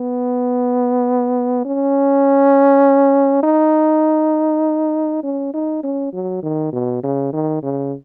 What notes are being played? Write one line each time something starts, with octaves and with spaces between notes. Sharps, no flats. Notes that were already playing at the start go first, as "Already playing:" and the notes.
Already playing: B3
C#4
D#4
C#4
D#4
C#4
F#3
D#3
B2
C#3
D#3
C#3